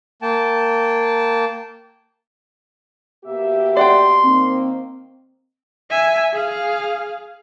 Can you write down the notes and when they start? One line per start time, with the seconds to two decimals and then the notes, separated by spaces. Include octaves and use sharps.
0.22 A#3 G5 A5
3.25 B2 A#3 G4 E5
3.77 D5 F#5 G5 C6
4.23 D#3 A#3 C4
5.90 E5 G#5
6.33 G#4 F5